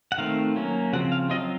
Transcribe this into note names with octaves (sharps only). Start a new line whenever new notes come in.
F#5
D#3 A3 C4 F5
F#3 A#3 C#4
C#3 F3 C4 F#5
F5
F#3 C4 F4 D#5